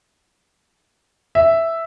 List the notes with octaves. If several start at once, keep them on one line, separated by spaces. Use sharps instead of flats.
E5